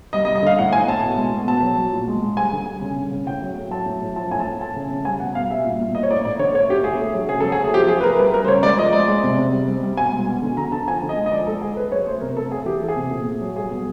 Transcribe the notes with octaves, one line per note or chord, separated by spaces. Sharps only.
G3 D#5
D#5
G3
D#5
D3 F5
A2 F#5
A2 G#5
A2 A5
B2
G#3
B2
B2 A5
F#3
F#3
A#2
G#3
G#3
G3 G#5
D3
G3
C#3
C#3
C#3
A2 G5
F#3
A3
F#3 A5
A2
A2
F3 A5
A2 G#5
A5
A2
A3 A5
C#3
C#3
G3 G#5
B2 F#5
B2 F5
G3 E5
A#2
A#2
A2 D#5
C#5
A2 D5
A2 D5
D3 C#5
A3 C#5
D3 G4
A2 G#4
A3
F#3
C#3 G#4
F#3 A4
G#4
A3
G#4
F3 G4
F3 G#4
B4
A3 A#4
G3 B4
G3 A#4
C5
C#3 C#5
G#3 D5
F3 D#5
G#3 D5
G#3
C3
C3
G3
G3
G3
B2 G#5
G#3
B2
D3
D3 A#5
D3 A5
F3 G#5
D3
D#5
G#3
D#5
F3 D5
G#3 A4
G#3 G#4
A3 B4
F#3 C#5
A3 C5
C3 A#4
A3 A4
A3 G#4
E3 G4
E3 A4
G#4
C3
A#2
A3
F#3
G3 G#4
B2